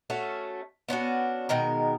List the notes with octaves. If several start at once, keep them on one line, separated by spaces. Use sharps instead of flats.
A3 C#4 F#4 A4
B3 C#4 D4 F#4
B2 D#3 G#3 A#4